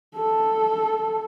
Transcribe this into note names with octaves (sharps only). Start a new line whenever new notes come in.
A4